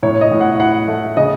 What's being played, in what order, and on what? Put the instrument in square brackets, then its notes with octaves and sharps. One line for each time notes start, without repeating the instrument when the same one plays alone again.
[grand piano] A2 C#5
D#5
A2
F#5
E4 F#5
A3
C#3 D#5